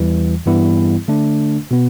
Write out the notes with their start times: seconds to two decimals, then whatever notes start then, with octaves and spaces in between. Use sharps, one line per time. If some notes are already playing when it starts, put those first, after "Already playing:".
Already playing: E2 E3 G3
0.46 G2 E3 G3 B3 E4
1.08 D3 A3 D4
1.71 B2 B3